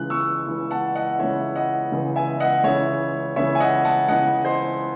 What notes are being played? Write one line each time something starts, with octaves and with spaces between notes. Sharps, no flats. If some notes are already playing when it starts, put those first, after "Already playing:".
Already playing: C#2 C#3 E3 F#6
C#6 E6
C#2 C#3 E3
F#5 A5
D#5 F#5
C#2 C#3 E3 C#5 E5
D#5 F#5
C#2 C#3 E3
E5 G#5
D#5 F#5
C#2 C#3 E3 C#5 E5
C#2 C#3 E3 C#5 E5
G#5
D#5 F#5
F#5 A5
C#2 C#3 E3 D#5 F#5
C5 D#5